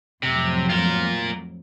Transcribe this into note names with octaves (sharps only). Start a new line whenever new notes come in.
F2 A2 C3 F#3
F4 A#4